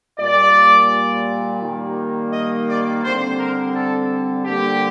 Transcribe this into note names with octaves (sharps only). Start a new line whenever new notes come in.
A#2 G3 A#3 D5
D#3 G3 A#3
D#5
D5
D3 G3 C4 C5
A#4
A4
D3 G3 A#3 G4